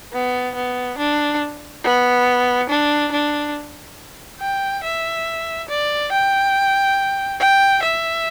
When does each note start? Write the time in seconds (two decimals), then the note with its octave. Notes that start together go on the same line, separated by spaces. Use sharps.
0.13 B3
0.55 B3
0.98 D4
1.84 B3
2.70 D4
3.12 D4
4.40 G5
4.84 E5
5.69 D5
6.12 G5
7.40 G5
7.83 E5